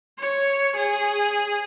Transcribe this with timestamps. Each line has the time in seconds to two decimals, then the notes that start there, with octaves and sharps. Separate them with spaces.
0.19 C#5
0.76 G#4